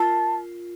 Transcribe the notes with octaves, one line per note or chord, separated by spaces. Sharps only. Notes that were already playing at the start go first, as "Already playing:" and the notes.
Already playing: F4 A#4 A5